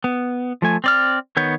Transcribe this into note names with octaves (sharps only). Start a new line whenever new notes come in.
B3
F3 A3 G#5
C4 D5 F6
D#3 B3 C#5 G6